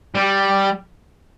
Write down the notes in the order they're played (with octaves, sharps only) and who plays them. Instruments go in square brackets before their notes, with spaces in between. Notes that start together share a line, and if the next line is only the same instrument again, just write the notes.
[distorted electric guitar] G3